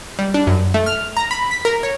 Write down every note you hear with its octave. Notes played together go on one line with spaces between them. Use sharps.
G3
D4
F#2
A3
F6
A#5
B5
B6
A#4
C#5